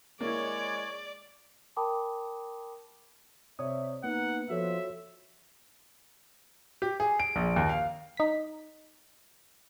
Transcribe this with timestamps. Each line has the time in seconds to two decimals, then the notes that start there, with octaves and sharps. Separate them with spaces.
0.20 G#3 A#3 E4 C#5 D5 C#6
1.76 A#4 G5 A5 B5 D6 D#6
3.59 C3 C#5 D5 E5 D#6
4.04 A#3 B3 D#4 F#5
4.50 F3 F#4 A4 C#5 E5
6.82 G4
7.00 G#4
7.20 D7
7.36 A#1
7.56 D#2
7.69 F5
8.17 D#4 B6